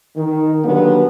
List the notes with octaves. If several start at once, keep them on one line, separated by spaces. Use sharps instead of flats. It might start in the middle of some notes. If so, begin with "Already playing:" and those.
D#3
A#2 D3 F#3 G3 B3